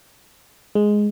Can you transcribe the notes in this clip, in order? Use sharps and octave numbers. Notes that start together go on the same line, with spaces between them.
G#3